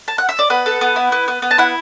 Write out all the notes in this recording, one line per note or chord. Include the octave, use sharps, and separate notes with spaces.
A5
F#5
E5
D5
B3 B4
A4
B3
E4
B3
B3
B3
A5
E4 F#5